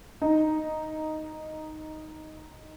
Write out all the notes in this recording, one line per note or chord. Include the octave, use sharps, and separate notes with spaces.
D#4